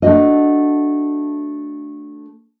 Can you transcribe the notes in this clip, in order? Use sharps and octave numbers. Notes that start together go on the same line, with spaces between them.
A3 D4 F#4 D#5